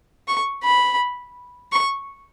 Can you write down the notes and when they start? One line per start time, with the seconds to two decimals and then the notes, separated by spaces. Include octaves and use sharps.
0.28 C#6
0.64 B5
1.72 C#6